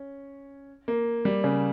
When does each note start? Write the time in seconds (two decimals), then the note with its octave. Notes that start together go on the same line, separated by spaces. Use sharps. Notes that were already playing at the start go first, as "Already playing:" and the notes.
Already playing: C#4
0.88 A#3
1.25 G3
1.44 C#3